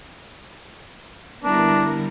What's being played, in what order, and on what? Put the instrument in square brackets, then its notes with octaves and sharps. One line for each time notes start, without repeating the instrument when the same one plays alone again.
[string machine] D3 G3 [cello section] B3 E4 A#4 [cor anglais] D4